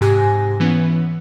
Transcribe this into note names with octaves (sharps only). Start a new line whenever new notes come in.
G#2 C3 G4 G#5 F#6 A#6
E3 B3 C#4